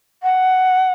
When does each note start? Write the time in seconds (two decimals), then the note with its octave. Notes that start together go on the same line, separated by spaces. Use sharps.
0.23 F#5